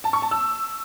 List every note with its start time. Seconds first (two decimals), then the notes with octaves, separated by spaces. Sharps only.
0.04 A5
0.13 C#6
0.22 A5
0.31 E6